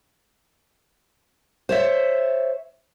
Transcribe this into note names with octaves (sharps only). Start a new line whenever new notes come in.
C5 C#5 E5